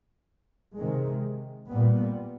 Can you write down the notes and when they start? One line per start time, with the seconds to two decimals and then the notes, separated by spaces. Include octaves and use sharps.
0.77 C3 D#3 G#3
1.69 A#2 G3 B3